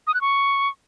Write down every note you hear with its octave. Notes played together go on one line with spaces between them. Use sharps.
D#6
F#6
C#6